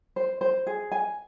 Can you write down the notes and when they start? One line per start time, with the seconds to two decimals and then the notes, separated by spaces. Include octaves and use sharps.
0.16 C5
0.41 C5
0.67 G#4
0.92 G#5